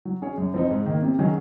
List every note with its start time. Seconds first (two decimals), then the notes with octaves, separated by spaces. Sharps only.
0.05 F#3
0.22 C#4 G#4 C#5
0.38 F#2
0.54 F3 C4 D#4
0.71 G#2
0.86 D#3 A#3
1.03 C3
1.19 D#3 F#3 C#4 G#4